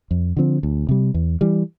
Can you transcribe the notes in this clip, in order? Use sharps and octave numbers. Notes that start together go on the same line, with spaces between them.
F2
D3 F3 C4
D2
C3 G3
E2
E3 G3